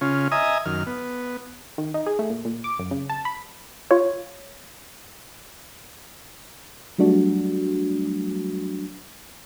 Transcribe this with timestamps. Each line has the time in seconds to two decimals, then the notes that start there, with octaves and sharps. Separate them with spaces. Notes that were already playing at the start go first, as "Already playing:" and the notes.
0.01 C#3 C#4 F4
0.32 D#5 E5 G#5 A#5 D#6
0.66 F#2 D#3 F6
0.87 B3
1.78 D#3
1.94 D#4
2.06 G#4
2.19 A3
2.30 A#2
2.45 A#2
2.64 D6
2.79 F#2
2.91 C#3
3.10 A5
3.25 B5
3.91 F4 C#5
6.98 F#3 G3 A3 D4 F#4